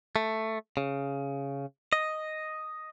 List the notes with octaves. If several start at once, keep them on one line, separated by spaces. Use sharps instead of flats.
A3
C#3
D#5